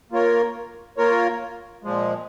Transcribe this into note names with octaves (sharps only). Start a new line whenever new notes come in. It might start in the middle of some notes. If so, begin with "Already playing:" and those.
A#3 F4 A#4 C#5
A#3 F4 A#4 C#5
A#2 F3 G#3